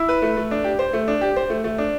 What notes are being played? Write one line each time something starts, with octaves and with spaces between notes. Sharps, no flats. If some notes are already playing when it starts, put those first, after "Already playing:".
Already playing: E4
B4
A3
A3
D4
G4
C5
A3
D4
G4
C5
A3
A3
D4